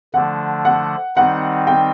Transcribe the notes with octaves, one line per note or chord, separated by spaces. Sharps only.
D3 F3 A3 D4 F#5
F#5
D#3 G3 C4 D#4 F#5
G5